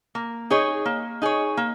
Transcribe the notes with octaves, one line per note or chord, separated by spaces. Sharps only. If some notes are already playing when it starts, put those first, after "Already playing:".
A#3
D#4 G#4 C#5
A#3
D#4 G#4 C#5
A#3